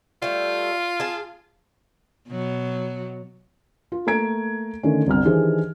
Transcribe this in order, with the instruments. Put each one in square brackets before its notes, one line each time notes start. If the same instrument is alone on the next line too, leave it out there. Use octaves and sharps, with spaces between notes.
[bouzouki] G3 A3 [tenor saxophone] F4
[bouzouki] G#4 A5
[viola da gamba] B2 F#3
[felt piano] F4
A3 A#3 A#5 G#6 D7
D3 D#3 A3 C#4
G1 C2 F6
D#3 E3 D4 G4 G#4 C5